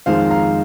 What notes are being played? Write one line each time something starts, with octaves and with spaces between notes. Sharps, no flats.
F2 D#3 G#3 D#4 C5 F5
F5 A#5